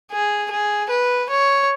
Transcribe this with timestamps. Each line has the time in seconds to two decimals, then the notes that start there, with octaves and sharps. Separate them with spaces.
0.12 G#4
0.51 G#4
0.90 B4
1.30 C#5